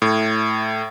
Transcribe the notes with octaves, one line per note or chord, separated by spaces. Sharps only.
A2